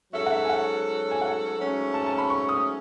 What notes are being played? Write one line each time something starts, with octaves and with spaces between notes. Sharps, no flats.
G#2 F#3 C#4 F#4 A4 E5
F#5
E5
G#5
F#5
G#5
F#5
G#2 F#3 A3 C#4
A5
A5
B5
C#6
D#6